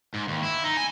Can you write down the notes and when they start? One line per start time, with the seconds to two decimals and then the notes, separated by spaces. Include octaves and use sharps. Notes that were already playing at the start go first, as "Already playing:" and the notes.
0.14 G#2
0.28 D#2
0.43 E4
0.64 D#4
0.77 G#5